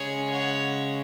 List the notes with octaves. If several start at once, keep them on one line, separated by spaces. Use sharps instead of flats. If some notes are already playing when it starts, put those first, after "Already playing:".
Already playing: C#3 G#3 G#4 C#5
C#5 F#5